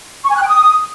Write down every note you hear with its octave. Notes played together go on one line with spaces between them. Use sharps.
C#6
G#5
F#6
G5
D#6